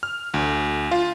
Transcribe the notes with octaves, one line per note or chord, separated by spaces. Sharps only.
F6
D2
F4